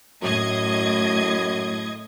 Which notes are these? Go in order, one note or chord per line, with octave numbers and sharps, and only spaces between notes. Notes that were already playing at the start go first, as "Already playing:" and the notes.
F#2 A2 D#5 G#6